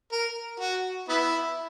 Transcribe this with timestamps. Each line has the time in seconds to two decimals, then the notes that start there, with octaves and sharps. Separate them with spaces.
0.12 A#4
0.60 F#4
1.09 B3 E4